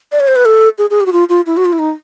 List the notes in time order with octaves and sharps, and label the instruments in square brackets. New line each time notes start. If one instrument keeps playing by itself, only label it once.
[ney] D5
C#5
C5
B4
A4
G#4
G#4
G4
F#4
F4
F4
E4
F#4
F4
E4
D#4